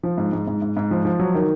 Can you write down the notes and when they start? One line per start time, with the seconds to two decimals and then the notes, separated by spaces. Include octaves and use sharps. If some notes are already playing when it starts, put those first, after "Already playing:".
0.03 F3
0.18 G#2
0.33 G#2
0.47 G#2
0.62 G#2
0.77 G#2
0.91 F3
1.05 F3
1.19 F#3
1.34 D#3